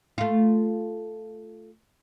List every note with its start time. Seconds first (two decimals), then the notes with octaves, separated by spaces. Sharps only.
0.18 A3 F4